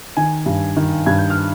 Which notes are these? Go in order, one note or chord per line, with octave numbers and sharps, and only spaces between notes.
D#3 G#5
G2
D#3
G2 G#6
G6
F6